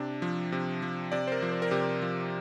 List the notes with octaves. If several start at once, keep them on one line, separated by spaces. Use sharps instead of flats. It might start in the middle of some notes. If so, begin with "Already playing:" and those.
Already playing: C3 D4
F3
C3
F3
C3 D5
C5
A#4
F3
C5
A#4
C3 G4
A#4
F3